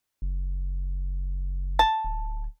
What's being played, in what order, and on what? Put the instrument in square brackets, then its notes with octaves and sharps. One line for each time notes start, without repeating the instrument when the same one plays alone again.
[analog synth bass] F#1
[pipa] A5
[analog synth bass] D1